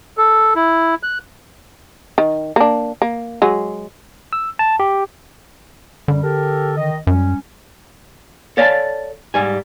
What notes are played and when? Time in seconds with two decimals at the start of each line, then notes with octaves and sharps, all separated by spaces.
0.18 A4
0.56 E4
1.03 F#6
2.18 D#3
2.56 A#3 D4
3.02 A#3
3.42 F#3 G#3
4.33 E6
4.59 A5
4.80 G4
6.08 F#2 D3 G3
6.23 G4 A4 A#4
6.77 D#3 D#5
7.07 F#2 G3 C#4
8.57 A4 C#5 D5 F5 G#5 A5
9.34 G#2 G3 G#5